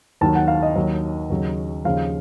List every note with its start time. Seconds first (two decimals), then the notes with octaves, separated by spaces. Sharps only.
0.21 D#2 D#3 F#3 A5
0.35 F#5
0.48 F5
0.63 D#5
0.76 D#2 D#3 F#3
1.30 D#2 C#3 F#3
1.85 D#2 C#3 F3 F5